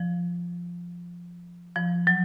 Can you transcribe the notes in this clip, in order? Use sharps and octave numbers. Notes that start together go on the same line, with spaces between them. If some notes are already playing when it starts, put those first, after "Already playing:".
Already playing: F3
F3
F#3